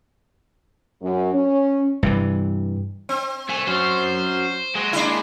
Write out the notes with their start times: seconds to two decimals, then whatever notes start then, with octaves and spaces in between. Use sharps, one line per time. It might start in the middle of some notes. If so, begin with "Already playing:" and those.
1.02 F#2
1.34 C#4
2.03 G2 C3 E3
3.09 C4
3.49 C2 A3 G#5
3.67 F#3 C#4 C5
4.75 F#3 G#3
4.93 D#3 A#3 D4 E4